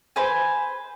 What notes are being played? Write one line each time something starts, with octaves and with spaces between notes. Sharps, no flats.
B4 C5 G#5